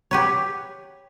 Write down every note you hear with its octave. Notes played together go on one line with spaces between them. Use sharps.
G4 B4 C#5